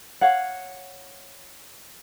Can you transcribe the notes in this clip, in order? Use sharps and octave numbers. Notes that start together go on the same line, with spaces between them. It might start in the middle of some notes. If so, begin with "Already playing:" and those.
C#5 F5 F#5